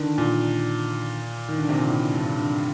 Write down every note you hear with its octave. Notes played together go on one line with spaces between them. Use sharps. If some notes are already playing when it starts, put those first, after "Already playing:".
Already playing: D3 D#3
A#2
D#3
D3
C3
A#2
A2
G2
D3